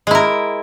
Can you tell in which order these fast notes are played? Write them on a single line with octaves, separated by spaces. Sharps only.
G#3 E4 A#4